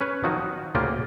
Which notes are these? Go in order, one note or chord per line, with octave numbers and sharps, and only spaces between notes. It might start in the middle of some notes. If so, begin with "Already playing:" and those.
C#4 B4 C#5
D#3 F3 F#3 D#4 F#4
D2 C#3 A#3 C#4 F4 G5